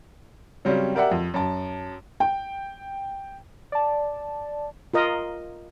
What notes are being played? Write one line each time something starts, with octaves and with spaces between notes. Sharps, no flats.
C#3 F#3 G3 C4 C#4
G4 A#4 D5 E5 F#5
F2
F#2 A5
G5
D5 A5
F4 A#4 D#5